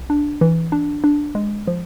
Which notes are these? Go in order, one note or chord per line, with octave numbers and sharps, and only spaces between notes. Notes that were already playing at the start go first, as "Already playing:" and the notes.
Already playing: B1
D4
E3
D4
D4
G#3
F3